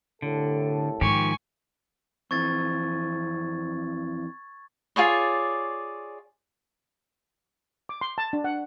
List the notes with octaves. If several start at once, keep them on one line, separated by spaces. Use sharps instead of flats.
C2 A2 D3 A4
G#2 D#3 F3 G4 G#5 C#6
F2 E3 C4 C#6 G#6 A6
F4 G#4 C#5 D5
D6
C6
A5
D4
F#5